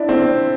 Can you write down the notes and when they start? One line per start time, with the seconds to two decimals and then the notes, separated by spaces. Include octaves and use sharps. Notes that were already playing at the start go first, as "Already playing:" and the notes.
Already playing: D4 E4
0.09 C4